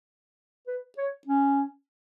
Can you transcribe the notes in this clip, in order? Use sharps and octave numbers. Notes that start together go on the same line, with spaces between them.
B4
C#5
C#4